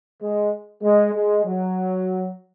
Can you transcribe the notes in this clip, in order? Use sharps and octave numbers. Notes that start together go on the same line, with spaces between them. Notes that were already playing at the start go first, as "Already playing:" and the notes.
G#3
G#3
G#3
F#3